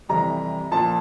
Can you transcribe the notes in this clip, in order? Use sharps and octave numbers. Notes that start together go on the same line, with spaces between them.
F2 C3 E3 G3 A#5
A#2 F3 A5